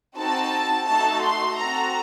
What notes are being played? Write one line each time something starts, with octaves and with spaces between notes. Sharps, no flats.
C4 D#4 F#4 A4 A5
A3 D#4 F#4 A4 A5
C6
C4 F#4 A4 A#5